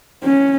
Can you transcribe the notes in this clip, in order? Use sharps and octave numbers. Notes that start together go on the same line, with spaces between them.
C#4